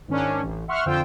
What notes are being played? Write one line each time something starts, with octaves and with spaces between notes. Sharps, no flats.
G#2 D#3 C#4 D4
A1
E5 F#5 C6 C#6 F6
F2 D3 F4 C5 G5 E6